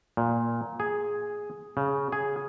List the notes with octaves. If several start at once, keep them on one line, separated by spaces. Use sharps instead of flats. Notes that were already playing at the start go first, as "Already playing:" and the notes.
A#2
G#4
C#3
G#4